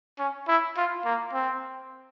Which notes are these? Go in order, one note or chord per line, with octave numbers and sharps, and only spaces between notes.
C#4
E4
F4
A#3
C4